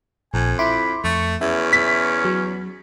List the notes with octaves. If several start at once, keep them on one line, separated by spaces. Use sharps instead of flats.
A#1 F2 G#5
E4 B5 C6 D6
F2 A3 C#6
E2 C#4 E5
B6
F#3